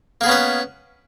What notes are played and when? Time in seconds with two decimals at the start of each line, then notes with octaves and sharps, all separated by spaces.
0.21 A#3
0.24 G#4
0.26 B3
0.29 C#4
0.31 B4